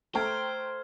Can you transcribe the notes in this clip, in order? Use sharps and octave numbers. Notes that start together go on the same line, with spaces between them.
A3 C5 G5 A#5 C6 C#6 F6 G#6